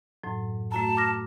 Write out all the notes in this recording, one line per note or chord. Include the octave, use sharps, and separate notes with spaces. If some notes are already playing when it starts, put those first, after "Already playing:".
F#2 A2 F#3
A3 F#4 A5 A#5
D6 F6 A#6